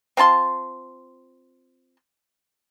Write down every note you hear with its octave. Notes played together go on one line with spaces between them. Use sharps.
C4 F4 A5 C6